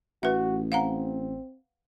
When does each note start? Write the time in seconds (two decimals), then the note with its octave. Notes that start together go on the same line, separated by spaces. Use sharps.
0.23 A1 F#4 B4 E5
0.72 C4 F5 F#5 A#5